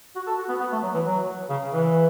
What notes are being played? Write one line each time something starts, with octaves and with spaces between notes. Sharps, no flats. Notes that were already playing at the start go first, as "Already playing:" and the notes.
F#4
A4
F#4
B3
B3
A3
F#3
E3
F#3
C#3
E3